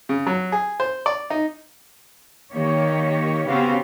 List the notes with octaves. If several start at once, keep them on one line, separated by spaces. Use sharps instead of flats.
C#3
F#3
G#4
C5
D5
D#4
D#3 A#3 G4 C#5
C#3 B3 C4 F#4 G4 F5